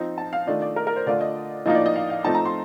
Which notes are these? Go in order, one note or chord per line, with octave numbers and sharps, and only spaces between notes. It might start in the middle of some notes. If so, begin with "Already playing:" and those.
Already playing: F3 C4 D#4
A5
F5
D#3 A3 D4 F4 D#5
D5
A#4
A#4
C5
D3 A3 D4 F4 D5
D#5
A2 F3 A#3 D#4 D#5
D5
D#5
F5
F5
F3 A3 C4 D#4 A5
A#5
C6